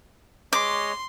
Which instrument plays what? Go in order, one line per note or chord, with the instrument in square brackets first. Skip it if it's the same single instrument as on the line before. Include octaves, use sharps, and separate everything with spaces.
[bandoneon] G#3 C#5 D#5 [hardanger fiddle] C6 [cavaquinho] D6